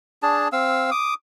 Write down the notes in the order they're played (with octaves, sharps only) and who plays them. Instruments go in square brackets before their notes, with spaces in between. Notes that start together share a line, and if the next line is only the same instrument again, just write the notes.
[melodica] D4 G#4 A5
C4 F5 E6
D6 D#6